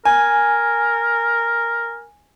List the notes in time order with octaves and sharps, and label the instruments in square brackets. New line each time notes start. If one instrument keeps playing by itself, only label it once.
[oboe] A#4 [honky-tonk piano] G#5